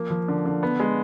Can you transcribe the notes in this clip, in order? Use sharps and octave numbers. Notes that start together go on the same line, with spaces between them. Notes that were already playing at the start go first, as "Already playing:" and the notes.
Already playing: F3 A#3
F3
D3
D3
B3
G#3